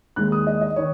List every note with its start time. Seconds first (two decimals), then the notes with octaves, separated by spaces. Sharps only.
0.16 D#2 D#3 G#3 F#6
0.32 D#6
0.47 D#5
0.61 D#5
0.76 D#3 C#5